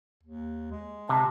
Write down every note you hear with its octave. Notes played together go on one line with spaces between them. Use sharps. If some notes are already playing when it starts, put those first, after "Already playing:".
D#2
G#3
C3 A5